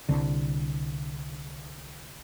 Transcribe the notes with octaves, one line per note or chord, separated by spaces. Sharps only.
C2 D3